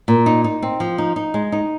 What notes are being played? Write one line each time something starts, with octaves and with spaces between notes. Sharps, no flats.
A#2
D#4
D#4
C4
F3
D#4
D#4
G#3
D#4